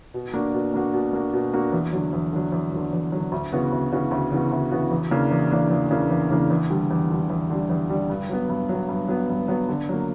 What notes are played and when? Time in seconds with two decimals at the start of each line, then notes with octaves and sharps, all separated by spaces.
0.14 B2
0.34 A#3 D4 F#4
0.54 B2
0.74 A#3 D4 F#4
0.94 B2
1.13 A#3 D4 F#4
1.33 B2
1.53 A#3 D4 F#4
1.73 E2
1.93 D3 F#3
2.13 E2
2.33 D3 F#3
2.52 E2
2.72 D3 F#3
2.93 E2
3.12 D3 F#3
3.32 D2
3.53 C#3 E3 B3 F#4
3.72 D2
3.92 C#3 E3 B3 F#4
4.11 D2
4.31 C#3 E3 B3 F#4
4.52 D2
4.71 C#3 E3 B3 F#4
4.91 E2
5.11 C#3 E3 A#3 D4
5.31 E2
5.51 C#3 E3 A#3 D4
5.70 E2
5.91 C#3 E3 A#3 D4
6.11 E2
6.30 C#3 E3 A#3 D4
6.50 E2
6.70 D3 G3
6.91 E2
7.11 D3 G3
7.30 E2
7.50 D3 G3
7.70 E2
7.89 D3 G3
8.09 G2
8.29 F#3 B3
8.49 G2
8.69 F#3 B3
8.89 G2
9.08 F#3 B3
9.29 G2
9.48 F#3 B3
9.69 D3
9.89 F#3 A#3